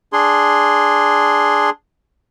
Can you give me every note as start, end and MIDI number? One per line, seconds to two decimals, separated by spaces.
0.13 1.70 62
0.13 1.70 68
0.13 1.70 84